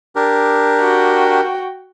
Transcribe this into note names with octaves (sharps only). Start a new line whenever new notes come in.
D4 G4 A#4
F#4 G5